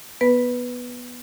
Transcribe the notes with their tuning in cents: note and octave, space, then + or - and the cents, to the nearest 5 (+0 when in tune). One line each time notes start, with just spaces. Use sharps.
B3 -10 B4 +0